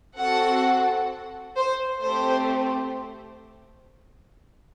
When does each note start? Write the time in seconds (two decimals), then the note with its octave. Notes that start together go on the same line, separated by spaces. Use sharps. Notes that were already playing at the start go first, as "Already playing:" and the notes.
0.17 C4 F#4 A4 F#5
1.57 C5
2.03 A3 C4 G4 C5